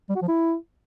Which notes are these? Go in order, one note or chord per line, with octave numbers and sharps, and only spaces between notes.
G3
F#4
F3
E4